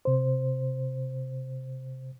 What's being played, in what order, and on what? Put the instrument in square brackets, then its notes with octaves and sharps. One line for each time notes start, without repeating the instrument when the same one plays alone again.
[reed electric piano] C3 C5